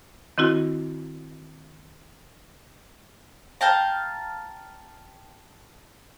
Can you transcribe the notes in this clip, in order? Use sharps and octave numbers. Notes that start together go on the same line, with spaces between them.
D#3 C4 E4 F#4
F5 G5 A5 A#5